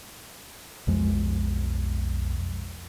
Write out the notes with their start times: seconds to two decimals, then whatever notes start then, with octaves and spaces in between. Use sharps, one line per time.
0.87 B1 F2 F3 G#3